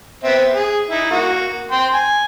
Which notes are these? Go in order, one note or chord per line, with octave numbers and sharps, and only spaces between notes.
B3 C4 E5
G#4
D#4 E4
A#3 F#4
G5 C6
G#5